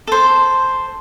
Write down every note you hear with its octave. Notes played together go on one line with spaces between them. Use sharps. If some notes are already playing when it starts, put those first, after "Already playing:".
A4 C5